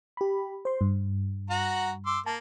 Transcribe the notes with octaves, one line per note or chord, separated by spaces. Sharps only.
G4 B5
C5 C6
G2
F#4 F#5 A#5
C6 D6 E6
A#3 A5